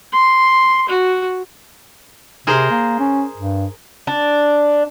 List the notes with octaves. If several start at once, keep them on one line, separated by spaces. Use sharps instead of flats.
C6
F#4
C3 G#4 A#4 C5
A#3
C#4
G2
D4